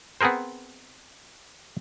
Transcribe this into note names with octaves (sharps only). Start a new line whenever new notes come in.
B3 C4 G#4 A#4 C5